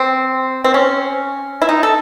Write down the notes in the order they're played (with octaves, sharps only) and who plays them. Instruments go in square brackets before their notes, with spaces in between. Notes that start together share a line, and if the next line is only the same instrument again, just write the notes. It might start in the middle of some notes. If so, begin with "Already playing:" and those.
Already playing: [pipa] C4
C4
C#4
E4
D#4
A4